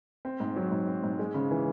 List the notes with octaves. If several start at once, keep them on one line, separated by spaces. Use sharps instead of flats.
C4
G#2
F#3
G#2
C4
G#2
G#3
C#3
E3